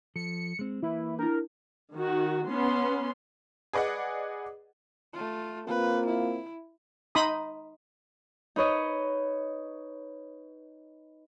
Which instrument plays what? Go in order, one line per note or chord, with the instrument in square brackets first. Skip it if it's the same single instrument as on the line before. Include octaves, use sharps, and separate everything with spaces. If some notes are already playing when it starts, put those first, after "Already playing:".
[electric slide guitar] F3 A4 [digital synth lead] C#7
[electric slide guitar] G#3 C4
[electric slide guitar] E3 A#3 B4 [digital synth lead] E4
[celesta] D4 E4 [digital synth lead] A#4
[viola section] D#3 F#4
B3 C#4 C6
[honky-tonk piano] G#4 B4 D5 D#5 F#5
[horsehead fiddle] A3 F4
[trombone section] A#3 C4 F4 [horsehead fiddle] B4
[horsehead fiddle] E4
[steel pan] D#4 B5 C6 D#6
[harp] D#4 B4 C#5 D#5